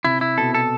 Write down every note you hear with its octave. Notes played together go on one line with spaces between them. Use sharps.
C3 E4
E4
B2 A4
A4